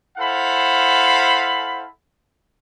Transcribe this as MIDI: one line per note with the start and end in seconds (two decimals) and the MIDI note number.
0.18 1.86 64
0.18 1.86 69
0.18 1.86 72
0.18 1.86 77
0.18 1.86 78
0.18 1.86 83